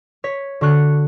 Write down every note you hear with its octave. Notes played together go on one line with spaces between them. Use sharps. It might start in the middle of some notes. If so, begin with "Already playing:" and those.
C#5 B6
D3 F#4 C#6 F#6